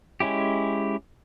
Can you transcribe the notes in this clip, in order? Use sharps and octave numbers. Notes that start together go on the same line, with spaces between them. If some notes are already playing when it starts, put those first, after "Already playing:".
G#3 C#4 E4 G4